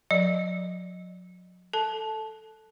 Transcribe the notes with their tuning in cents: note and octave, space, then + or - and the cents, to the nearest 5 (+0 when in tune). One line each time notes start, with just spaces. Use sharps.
F#3 -40 D5 +0
A4 +0 A5 -15